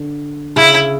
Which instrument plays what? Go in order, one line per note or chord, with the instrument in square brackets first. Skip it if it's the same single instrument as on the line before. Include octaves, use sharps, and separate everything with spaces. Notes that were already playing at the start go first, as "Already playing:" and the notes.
Already playing: [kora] D3
[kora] C#3 [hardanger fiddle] E4